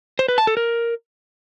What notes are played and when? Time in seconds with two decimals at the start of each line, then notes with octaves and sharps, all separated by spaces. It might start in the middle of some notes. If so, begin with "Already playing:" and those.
0.19 C5
0.28 B4
0.38 A5
0.47 A4
0.57 A#4